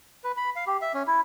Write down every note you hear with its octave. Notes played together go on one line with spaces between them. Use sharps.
B4
B5
F5
G4
E5
C#4
E4